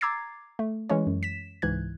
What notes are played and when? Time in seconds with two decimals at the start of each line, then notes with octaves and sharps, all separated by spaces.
0.01 A#5 D6 E6 G#6 A6 C7
0.59 A3
0.89 E3 G#3 C#4 C#5
1.07 F#2
1.23 B6 E7
1.62 C#2 G#2 E3 F#6 G#6